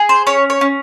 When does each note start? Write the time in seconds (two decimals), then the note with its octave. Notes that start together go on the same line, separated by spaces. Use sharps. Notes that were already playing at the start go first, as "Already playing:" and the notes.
Already playing: G#4
0.09 C5
0.27 C#4 C#5
0.50 C#5
0.61 C#4